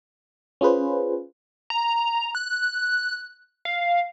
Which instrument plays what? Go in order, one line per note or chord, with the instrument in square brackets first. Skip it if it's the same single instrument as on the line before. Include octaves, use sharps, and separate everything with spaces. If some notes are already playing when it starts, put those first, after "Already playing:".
[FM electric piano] C#4 F4 G#4 B4 C5
[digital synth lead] A#5
F#6
F5